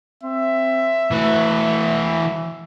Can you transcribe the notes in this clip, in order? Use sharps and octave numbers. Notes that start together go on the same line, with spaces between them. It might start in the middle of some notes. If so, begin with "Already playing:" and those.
C4 E5
E3 A3 F#4